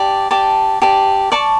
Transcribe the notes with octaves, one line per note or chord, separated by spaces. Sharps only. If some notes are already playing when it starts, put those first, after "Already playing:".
Already playing: G4 D5 A5
G4 D5 A5
G4 D5 A5
D5 A5 C#6